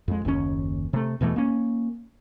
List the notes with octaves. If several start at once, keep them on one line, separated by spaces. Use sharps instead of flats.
F2 G#3
F#1 D#2 C#3 C#4
C3 A3
E2 B2 E3 A3
A#3 C#4